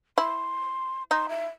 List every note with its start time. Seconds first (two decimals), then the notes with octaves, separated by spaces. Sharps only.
0.18 E4 C6
1.11 D#4 C6
1.29 E5